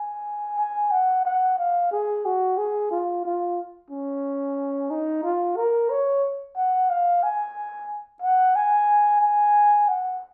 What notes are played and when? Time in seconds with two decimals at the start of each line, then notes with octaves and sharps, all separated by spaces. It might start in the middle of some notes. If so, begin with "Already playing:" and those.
Already playing: G#5
0.59 G#5
0.91 F#5
1.26 F#5
1.59 F5
1.92 G#4
2.25 F#4
2.58 G#4
2.91 F4
3.25 F4
3.91 C#4
4.90 D#4
5.23 F4
5.57 A#4
5.90 C#5
6.57 F#5
6.90 F5
7.23 G#5
8.22 F#5
8.56 G#5
9.22 G#5
9.88 F#5